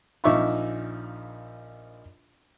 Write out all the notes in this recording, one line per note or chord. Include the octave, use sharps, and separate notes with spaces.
A#1 F3 D#4 E5 C#6 D6